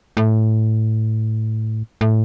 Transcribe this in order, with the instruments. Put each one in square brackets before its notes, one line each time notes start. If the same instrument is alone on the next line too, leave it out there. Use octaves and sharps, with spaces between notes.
[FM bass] A2
A2